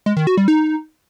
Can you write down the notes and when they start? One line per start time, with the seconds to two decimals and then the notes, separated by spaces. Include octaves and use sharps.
0.06 G#3
0.17 D#3
0.27 F#4
0.37 G3
0.48 D#4